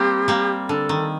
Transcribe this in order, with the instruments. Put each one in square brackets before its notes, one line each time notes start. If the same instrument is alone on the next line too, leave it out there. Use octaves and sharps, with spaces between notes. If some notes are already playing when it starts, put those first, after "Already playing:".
Already playing: [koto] G3 A#3 C4 [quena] G4
[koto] G3 A#3
[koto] D3 [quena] A4
[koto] D#3